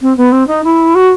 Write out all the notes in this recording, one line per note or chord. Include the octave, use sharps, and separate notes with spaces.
C4
B3
C4
D#4
E4
F#4